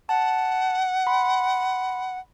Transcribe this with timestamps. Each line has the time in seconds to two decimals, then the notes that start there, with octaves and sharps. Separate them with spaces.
0.09 F#5 A5
1.07 B5 C6